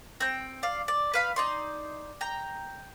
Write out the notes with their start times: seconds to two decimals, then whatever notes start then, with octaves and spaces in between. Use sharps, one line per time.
0.20 C4 G5
0.63 D5 F5
0.88 D5
1.14 B4 F5 B5
1.36 D#4 D5 C6
2.21 G5 A#5